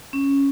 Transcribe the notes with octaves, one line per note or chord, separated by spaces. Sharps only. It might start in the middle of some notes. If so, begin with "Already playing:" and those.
C#4